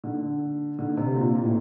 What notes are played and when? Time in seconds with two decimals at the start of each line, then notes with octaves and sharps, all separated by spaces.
0.04 D3
0.79 D3
0.97 C3
1.16 A#2
1.35 A#2
1.44 A2